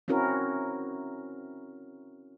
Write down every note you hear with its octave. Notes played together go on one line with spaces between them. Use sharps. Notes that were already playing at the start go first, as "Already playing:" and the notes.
C4 C#4 E4 F#4 A#4